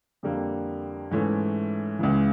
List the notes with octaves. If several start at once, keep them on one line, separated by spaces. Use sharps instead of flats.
F2 D3 G3 A#3
G#2 E3 A3 C#4
C#2 C#3 E3